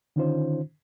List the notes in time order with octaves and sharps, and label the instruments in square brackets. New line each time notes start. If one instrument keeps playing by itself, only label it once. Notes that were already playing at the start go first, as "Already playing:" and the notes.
[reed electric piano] D3 D#3 C#4 D#4 F4 C5